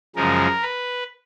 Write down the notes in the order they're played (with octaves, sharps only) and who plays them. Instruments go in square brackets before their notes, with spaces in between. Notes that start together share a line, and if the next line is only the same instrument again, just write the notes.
[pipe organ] F#2 C#3 F3 G#3 A#4
B4